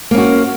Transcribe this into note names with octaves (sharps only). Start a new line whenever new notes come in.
A#3 C#4 F#4